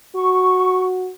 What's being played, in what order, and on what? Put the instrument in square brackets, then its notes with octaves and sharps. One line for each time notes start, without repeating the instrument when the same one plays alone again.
[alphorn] F#4 [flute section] C#6